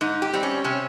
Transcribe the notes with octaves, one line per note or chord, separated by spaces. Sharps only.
G#2 D#4
G4
G3 C4
C#4
C3 C#4